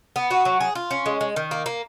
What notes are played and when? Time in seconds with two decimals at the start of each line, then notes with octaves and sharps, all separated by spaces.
0.16 B3
0.31 F#4
0.45 F#3
0.61 G#4
0.75 F4
0.91 C#4
1.06 G#3
1.21 G#3
1.36 D#3
1.51 A#3
1.66 A#3